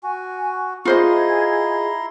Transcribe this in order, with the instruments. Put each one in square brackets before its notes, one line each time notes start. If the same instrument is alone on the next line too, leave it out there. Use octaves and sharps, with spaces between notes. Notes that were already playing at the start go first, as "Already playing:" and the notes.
[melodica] F#4 [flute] G#5
[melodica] E4 A#5 C6 [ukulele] F4 C5 D#5 [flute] G#4